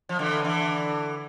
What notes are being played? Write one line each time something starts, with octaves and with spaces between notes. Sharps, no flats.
F3
D3 E3
D3 E3